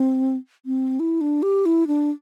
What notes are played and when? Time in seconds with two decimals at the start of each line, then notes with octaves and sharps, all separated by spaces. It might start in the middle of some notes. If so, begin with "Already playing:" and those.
Already playing: C4
0.66 C4
1.00 E4
1.21 D4
1.43 G4
1.66 E4
1.87 D4